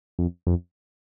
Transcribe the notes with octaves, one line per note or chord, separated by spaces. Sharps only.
F2
F2